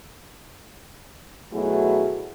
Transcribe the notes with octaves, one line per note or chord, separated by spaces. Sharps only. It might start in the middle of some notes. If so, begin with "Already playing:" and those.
B2 F#3 A3 E4 G#4